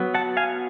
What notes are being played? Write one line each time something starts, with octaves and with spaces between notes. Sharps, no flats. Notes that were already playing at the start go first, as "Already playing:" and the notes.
Already playing: F#3 B3
F#5 A5
F5 G#5